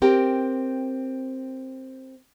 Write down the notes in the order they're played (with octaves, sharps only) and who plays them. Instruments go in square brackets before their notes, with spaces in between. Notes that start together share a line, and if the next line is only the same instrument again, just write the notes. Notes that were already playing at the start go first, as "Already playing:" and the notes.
[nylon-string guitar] C4 G4 A#4 G5